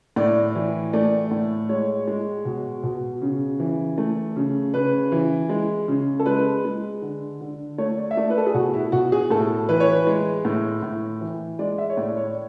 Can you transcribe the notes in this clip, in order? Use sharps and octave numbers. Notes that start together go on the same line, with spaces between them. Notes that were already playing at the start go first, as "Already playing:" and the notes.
A2 D5
E3
A3 D5
A2
G#3 C#5
G#3
B2
B2
C#3
E3
A3
C#3
C#3 B4
E3
G#3
C#3
A4
G#3 B4
G#3
D3
D3
A3 C#5
D5
E5
A3 D5
B4
A4
G#4
B2 F#4
E4
B2 F#4
G#4
A2 A4
E3 B4
C#5
B4
G#3
A2
A2
E3
G#3 D5
E5
C#5
A2 D5
C#5